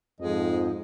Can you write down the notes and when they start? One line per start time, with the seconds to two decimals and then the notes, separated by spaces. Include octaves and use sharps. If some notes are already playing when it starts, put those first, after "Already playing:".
0.20 F2 G#2 F3 G#3 D#5